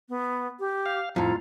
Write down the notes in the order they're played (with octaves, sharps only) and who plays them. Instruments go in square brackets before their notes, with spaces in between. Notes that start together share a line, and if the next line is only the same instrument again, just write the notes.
[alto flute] B3
G4
[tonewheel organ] F5
[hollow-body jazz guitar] F2 A2 [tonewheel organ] F4 [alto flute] A#5